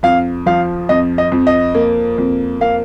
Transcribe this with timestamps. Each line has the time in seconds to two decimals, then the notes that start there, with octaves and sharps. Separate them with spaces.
0.03 F2 F5
0.46 F3 F5
0.89 F2 D#5
1.18 D#5
1.32 F2
1.47 D#5
1.75 A#3
2.18 F2
2.61 A#3 F5